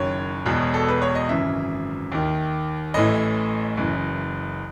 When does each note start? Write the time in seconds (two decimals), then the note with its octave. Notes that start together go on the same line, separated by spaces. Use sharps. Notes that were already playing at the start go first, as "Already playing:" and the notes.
Already playing: F#1 F#2 D#3 C#5
0.46 E1 E2 B2
0.74 A4
0.88 B4
1.02 C#5
1.15 D#5
1.28 G#1 F#2 C#3 E3 E5
2.12 D#2 D#3
2.94 A1 A2 E3 D#5
3.77 F#1 F#2 E3